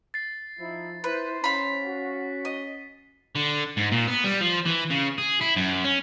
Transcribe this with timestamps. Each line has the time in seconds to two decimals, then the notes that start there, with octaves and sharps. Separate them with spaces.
0.14 A6 C7
0.59 F3 D#4 E4
1.04 E4 B4 C5
1.44 C#4 F5 B5 B6
1.83 F#4
2.45 D#5
3.36 D3
3.77 G#2
3.92 A#2
4.07 B3
4.24 G3
4.41 F3
4.66 E3
4.91 C#3
5.18 G#4
5.41 E4
5.56 F#2
5.84 C#4